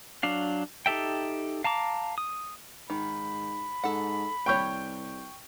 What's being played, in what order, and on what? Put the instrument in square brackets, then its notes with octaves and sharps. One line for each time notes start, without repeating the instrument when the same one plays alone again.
[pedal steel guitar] F#3 D4 F5
D#4 G4 A4 E5 G5
F5 A5 A#5 D6
D#6
[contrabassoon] G#2 [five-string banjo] D#3 [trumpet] B5
[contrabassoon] G#2 [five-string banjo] A4 F#5
[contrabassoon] C2 [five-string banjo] G3 C#5 [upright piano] G5 C#6 G6